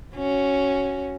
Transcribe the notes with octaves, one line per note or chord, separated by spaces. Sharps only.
C#4 F#4